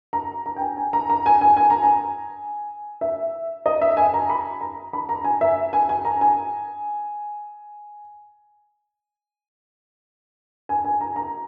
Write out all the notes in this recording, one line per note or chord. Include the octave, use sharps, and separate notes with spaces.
A#5
A#5
G5
G#5
G#5
A#5
A#5
G#5
G#5
G#5
A#5
G#5
E5
D#5
E5
G#5
A#5
B5
A#5
B5
A#5
G#5
E5
G#5
G#5
A#5
G#5
G#5
G#5
A#5
A#5